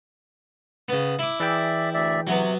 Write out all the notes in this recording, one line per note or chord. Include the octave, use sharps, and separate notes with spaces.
C#3 B3
E4 D6
E3 G#4 D5 E5 G5
D2 D5 E5
C3 F#3 B3